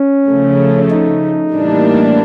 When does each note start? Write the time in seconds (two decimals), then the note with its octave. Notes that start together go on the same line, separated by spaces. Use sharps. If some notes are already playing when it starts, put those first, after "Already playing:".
Already playing: C#4
0.28 C#3 F3 A3
0.91 D#4
1.52 A2 E3 G3 A#3 D4